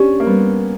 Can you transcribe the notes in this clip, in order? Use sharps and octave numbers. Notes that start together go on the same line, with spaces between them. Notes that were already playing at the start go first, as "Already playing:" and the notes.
Already playing: C#4 D4 G4
A#3
G3 B3